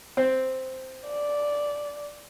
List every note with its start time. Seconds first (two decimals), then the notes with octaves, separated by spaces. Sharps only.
0.17 C4
1.06 D5